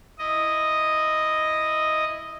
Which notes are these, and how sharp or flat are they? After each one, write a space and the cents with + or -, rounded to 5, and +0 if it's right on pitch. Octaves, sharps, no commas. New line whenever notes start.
E4 +0 D#5 +0